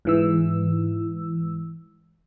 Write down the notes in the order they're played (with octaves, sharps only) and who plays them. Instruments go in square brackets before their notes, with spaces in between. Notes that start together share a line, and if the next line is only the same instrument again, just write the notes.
[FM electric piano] G#2 E3 E6